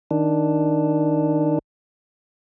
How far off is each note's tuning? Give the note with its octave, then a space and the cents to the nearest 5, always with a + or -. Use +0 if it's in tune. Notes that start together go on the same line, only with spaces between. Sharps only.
D#3 +0 D4 +0